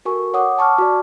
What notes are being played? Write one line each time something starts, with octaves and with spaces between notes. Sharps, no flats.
F#4 A4 A#4 G#5 C#6
C#5 F#5 D6 D#6
G#5 A5 C#6 D6 F6
F#4 D5